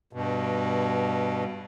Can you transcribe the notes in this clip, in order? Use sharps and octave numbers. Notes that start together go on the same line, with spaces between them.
G2 B2